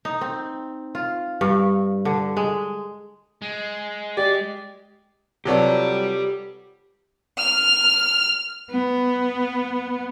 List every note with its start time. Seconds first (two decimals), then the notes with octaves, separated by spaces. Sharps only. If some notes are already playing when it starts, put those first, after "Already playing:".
0.05 D#4
0.21 C4
0.95 F4
1.41 G2
2.05 D3
2.37 G#3
3.42 G#3
4.17 G4 D5
5.45 C3 F#3 F4 G4 A4 B4 D5 F#5
7.38 F6
8.70 B3